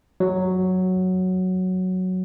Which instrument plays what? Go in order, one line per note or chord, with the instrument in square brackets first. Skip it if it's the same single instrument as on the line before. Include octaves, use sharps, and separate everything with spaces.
[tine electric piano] F#3